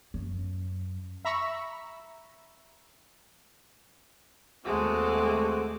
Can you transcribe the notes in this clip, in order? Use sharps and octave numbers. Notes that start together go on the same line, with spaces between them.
F#2
E5 A#5 B5 C#6 E6
D#2 G#3 A3 C4 F#4 A4 D6